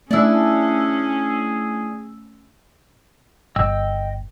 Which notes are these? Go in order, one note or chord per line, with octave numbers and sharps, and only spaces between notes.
A3 C#4 D4 E4 G#4 E6
G1 D#5 G5 E6